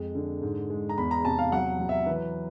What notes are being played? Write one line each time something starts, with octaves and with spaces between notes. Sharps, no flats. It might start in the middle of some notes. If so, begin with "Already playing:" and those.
Already playing: F2 G#3
D3
G#2
G#3
A#5
E2 B5
A#5
C3 A5
F5
F#3 F#5
F#3
E5
E3 B4